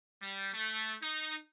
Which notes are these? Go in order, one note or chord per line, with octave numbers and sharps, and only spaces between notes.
G3
A3
D#4